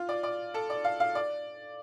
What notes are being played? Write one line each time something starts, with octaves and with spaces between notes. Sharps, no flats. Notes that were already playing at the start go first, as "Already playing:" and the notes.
Already playing: F4
D5
D5
A4
D5
F5
F5
D5